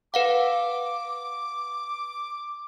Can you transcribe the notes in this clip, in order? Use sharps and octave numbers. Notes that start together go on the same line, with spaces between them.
B4 F5 F#5 D6